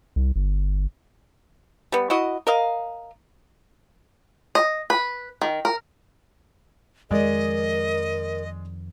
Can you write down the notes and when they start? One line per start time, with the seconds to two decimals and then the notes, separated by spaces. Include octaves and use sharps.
0.16 C2
0.36 G1
1.92 G3 B3
2.10 E4 F#4 D#5
2.47 A#4 D#5 F5
4.55 D#5
4.90 B4
5.41 D#3
5.65 A#4
7.11 F2 D#3 F3 G#3 A#4 D5 D#5